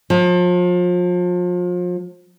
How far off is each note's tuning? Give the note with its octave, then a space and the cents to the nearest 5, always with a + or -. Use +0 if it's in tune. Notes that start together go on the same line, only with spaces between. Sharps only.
F3 +35